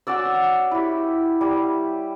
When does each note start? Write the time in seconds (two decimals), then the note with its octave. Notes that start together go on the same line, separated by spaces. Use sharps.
0.07 C#4 F#4 D5 E6
0.71 E4 G4
1.41 G3